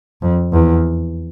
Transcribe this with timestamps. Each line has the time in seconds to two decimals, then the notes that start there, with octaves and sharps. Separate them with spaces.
0.22 F2
0.53 E2